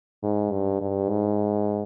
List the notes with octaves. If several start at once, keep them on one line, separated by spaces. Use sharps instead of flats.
G#2
G2
G2
G#2